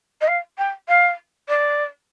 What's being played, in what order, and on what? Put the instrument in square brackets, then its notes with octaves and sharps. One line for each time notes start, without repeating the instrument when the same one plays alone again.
[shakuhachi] D#5
F5
G5
F5
D5